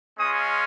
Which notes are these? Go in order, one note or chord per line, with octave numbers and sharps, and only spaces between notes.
G#3 C#4 F4 D#6